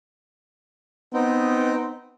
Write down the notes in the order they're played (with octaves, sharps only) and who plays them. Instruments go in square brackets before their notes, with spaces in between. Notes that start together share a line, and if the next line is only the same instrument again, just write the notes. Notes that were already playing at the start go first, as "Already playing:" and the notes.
[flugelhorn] B3 [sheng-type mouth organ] C4 D#4